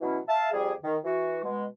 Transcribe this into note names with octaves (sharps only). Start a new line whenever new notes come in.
B2 E3 F#3 C#4 E4
E5 F5 A5
F2 G3 G4 G#4
D#3
E3 F#4
B2 G#3